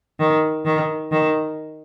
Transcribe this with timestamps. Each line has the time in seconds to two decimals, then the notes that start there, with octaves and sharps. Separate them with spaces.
0.20 D#3
0.65 D#3
1.12 D#3